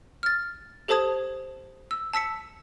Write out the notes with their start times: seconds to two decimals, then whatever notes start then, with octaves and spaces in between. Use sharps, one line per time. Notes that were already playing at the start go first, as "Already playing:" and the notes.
0.23 F6 A6
0.88 G4 A4 C5 A5 D#6 G#6
1.91 E6
2.13 A5 E6 B6 C#7